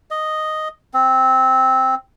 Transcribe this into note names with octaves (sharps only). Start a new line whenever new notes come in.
D#5
C4